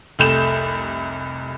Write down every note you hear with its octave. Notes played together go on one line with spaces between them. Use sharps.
F1 C2 A3 G6 E7